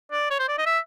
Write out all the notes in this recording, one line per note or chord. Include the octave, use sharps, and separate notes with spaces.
D5
C#5
C5
D5
D#5
E5